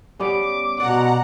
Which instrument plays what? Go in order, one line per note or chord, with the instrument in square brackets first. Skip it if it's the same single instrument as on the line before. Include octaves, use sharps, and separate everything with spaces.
[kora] G3 B3 C#4 [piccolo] D6
[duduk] B2 [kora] D5 [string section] F#5 A#5